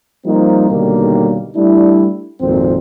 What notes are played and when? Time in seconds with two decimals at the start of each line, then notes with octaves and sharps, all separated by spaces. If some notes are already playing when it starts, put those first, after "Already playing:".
0.25 F3 G3 A#3 C4 D#4
0.69 B1 D3 D#3 G3 A#3
1.54 G3 A3 D4 E4
2.40 G#1 F2 A#2 C4